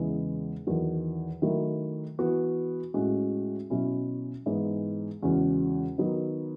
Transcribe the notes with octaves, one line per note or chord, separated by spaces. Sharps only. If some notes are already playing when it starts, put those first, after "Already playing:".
Already playing: E2 C#3 G#3 B3 E4
E2 D#3 F#3
D#3 F#3 A3 E4
E3 B3 F#4
A2 G#3 C#4 F#4
B2 F#3 C#4 E4
G#2 E3 G#3 B3 E4
E2 C#3 G#3 C#4 F#4
D#3 F#3 B3 D#4